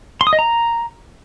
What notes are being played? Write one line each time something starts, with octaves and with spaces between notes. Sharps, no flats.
C6
D#6
D#5
A#5